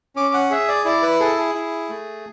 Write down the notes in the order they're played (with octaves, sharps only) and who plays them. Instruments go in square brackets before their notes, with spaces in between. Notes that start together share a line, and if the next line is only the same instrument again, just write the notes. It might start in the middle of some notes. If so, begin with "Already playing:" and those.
[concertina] C#4 D6
F#5
G#4 E5
D5
E4 D5
B4
G#4 A4
G#4
E4
A3